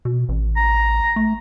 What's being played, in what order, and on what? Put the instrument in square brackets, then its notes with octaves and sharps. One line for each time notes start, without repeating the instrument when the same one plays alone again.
[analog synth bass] B2
A1
[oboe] A#5
[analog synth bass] A3